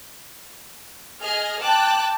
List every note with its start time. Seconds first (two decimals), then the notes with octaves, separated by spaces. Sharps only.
1.21 G#4 D#5 F6
1.61 G5 A5 D6 F#6